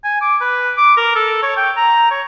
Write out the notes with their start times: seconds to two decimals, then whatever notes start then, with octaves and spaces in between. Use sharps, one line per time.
0.04 G#5
0.21 D6
0.41 B4
0.78 D6
0.97 A#4
1.15 A4
1.43 C#5
1.57 G5
1.77 A#5
2.11 C#5